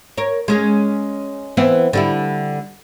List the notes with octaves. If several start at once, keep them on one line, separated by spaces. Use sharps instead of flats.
A#4 C#5
G#3 C#4 G#4
E3 B3 C4
D3 G3 E4